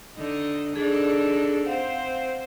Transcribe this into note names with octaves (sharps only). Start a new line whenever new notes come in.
D3 D#4 D#5
D4 D#4 G#4 A4
C4 C5 F5 F#5